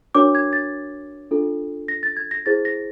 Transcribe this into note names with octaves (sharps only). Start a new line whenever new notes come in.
D4 F#4 A#4 C#5 D6
G#6
A6
D4 F4 A4
A#6
A6
G#6
A#6
E4 G#4 C5 A6
A#6